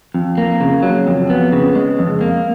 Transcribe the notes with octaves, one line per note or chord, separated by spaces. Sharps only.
F2
A#3
C#3
F#3
F2
B3
C#3
G#3
F2
A#3